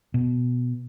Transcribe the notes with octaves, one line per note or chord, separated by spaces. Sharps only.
B2